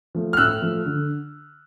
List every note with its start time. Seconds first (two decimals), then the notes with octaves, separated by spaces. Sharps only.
0.15 F3 A3
0.33 F6
0.37 A2 E6 F#6
0.61 F3 A3
0.86 D3